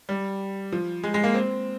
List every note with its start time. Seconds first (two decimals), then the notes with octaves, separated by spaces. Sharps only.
0.09 G3
0.72 F3
1.04 G#3
1.14 G#3
1.24 A#3
1.34 C4